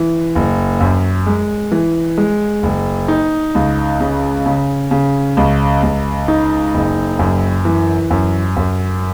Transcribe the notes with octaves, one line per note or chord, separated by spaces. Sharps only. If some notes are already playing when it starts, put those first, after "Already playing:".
Already playing: E3
F#1
F#2
G#3
E3
G#3
F#1
D#4
C#2
C#3
C#3
C#3
C#2
C#2
D#4
F#1
F#2
E3
F#2
F#2